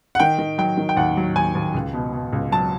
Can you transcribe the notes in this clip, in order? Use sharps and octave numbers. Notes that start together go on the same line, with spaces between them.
F#5
D#3 G5
D#3
F#3 G5
D#3
G5
D#2 F#5
F#3
D#2 G#5
D#2
C#2
B2
B2
C#2
F#3 A5